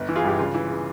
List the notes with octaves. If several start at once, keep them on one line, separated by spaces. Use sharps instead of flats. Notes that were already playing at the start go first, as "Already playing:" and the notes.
Already playing: G1
E3
F4 G#4
G2 G4
C#3 F4
E3
C#3